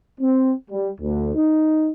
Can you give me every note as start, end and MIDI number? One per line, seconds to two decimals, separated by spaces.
0.20 0.52 60
0.71 0.90 55
1.01 1.33 38
1.35 1.90 63